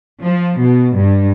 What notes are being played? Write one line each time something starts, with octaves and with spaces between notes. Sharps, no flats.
F3
B2
G2